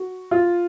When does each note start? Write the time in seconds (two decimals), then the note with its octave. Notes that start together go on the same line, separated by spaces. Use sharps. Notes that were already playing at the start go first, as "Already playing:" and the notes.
Already playing: F#4
0.31 F4